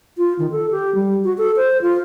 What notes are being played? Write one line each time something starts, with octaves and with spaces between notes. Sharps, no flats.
F4
D#3
A4
G4
G3
F#4
A4
C5
F4